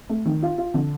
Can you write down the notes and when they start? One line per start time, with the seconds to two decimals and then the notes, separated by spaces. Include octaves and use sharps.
0.09 A3
0.25 D#3
0.42 F4
0.58 F4
0.74 D3